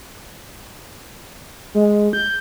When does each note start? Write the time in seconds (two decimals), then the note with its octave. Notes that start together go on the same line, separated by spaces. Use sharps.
1.75 G#3
2.13 G6